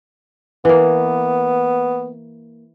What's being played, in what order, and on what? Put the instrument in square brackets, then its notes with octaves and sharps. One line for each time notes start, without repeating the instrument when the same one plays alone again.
[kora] E3 A#3 [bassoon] B3